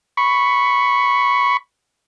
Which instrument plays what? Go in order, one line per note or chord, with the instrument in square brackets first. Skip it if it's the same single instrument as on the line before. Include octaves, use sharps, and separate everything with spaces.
[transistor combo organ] B5 C#6